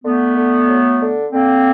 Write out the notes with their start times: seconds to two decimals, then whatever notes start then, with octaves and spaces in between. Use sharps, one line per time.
0.04 D3 A3 B3
0.36 D3
0.68 F#3
1.00 D3
1.31 D3 A#3 C4